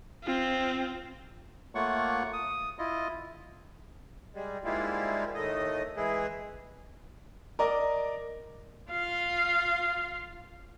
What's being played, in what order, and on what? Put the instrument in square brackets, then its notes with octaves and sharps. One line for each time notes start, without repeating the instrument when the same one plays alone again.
[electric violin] C4 F4
[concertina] A3 A#3 F4 C#5 F#5 C#6
D#6
E4 F4 D#5
[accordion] G3 G#3
G#2 G3 G#3 A#3 E4 F4
D#2 A2 A3 D#5
E3 G#3 E4 G#4
[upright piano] A#4 D5 D#5 D6
[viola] F4 F5